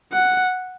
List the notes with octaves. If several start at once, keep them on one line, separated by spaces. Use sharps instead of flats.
F#5